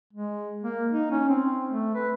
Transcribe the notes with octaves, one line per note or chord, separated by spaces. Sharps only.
G#3
A#3
D#4
C#4
C4
A3
B4